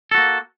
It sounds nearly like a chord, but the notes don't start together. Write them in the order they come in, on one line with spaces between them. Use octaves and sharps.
A4 F#4 A#3